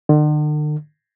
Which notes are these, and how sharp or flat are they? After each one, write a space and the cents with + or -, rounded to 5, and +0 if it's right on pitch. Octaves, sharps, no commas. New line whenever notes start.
D3 +45